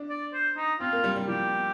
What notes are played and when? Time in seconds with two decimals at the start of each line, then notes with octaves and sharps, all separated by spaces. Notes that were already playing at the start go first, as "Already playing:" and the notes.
Already playing: D4
0.10 D5
0.33 C5
0.57 D#4
0.80 C4 F4
0.93 A#3
1.04 G3
1.16 G3
1.28 F3 G4